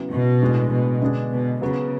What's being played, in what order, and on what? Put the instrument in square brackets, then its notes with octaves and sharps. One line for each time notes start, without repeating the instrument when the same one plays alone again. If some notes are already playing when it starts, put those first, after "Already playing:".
Already playing: [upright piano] C#3 F#3 B3 E4
[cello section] B2
[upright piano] A2 G#3 D4
[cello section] B2
[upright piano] D3 G#3 B3 D4 G#4
[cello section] B2
[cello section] C#3 [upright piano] F#3 B3 F#4